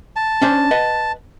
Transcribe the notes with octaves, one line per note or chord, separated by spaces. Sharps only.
A5
C#4 D4 C5
B4 D#5 F#5